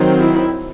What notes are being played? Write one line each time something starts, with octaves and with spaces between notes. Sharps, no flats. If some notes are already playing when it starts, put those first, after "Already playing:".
Already playing: D#3 F#3 C4
E4